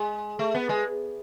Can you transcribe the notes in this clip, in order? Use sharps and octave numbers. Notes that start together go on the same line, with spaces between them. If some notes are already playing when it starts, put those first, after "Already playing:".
Already playing: G#3
A3
B3
G#3